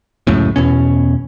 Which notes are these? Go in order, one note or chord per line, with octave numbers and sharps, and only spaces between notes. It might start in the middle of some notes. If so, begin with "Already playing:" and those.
C#2 F#2 A2
E2 B2 C#4